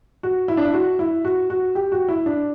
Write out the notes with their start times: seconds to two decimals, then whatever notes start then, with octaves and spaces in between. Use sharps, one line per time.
0.23 F#4
0.48 E4
0.57 D4
0.65 E4
0.74 F#4
0.99 E4
1.25 F#4
1.50 F#4
1.75 G4
1.92 F#4
2.09 E4
2.26 D4